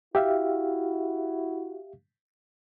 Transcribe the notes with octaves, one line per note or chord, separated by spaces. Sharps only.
E4 F#4 G4 E5 F5